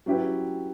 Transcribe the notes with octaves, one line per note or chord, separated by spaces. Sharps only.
F#3 C#4 E4 G4 B4